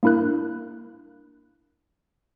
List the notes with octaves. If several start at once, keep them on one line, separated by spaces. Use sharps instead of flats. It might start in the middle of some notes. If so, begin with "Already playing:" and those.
A#3 D4 E4 A#4 F#6